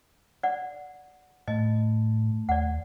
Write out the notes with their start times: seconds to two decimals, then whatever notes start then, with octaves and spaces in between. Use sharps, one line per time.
0.43 D5 F#5
1.48 A2 A3 D#5
2.49 D#2 D5 F#5